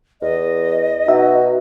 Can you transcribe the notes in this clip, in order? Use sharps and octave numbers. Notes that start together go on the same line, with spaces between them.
E2 D#5
B2 D#4 F#4 E5